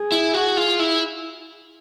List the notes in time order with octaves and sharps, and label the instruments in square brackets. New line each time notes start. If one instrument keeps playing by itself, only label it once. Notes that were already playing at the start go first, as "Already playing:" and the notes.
Already playing: [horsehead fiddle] G#4
[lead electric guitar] E4
F#4
F4
E4